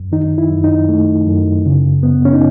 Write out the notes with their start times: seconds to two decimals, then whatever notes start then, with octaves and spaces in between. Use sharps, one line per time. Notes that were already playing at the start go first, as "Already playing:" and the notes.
Already playing: F#2
0.12 D#3 D#4
0.38 E4
0.51 F#2
0.64 D#4
0.89 A3
1.27 F#2
1.66 C#3
2.03 B3
2.25 C#4
2.33 D#4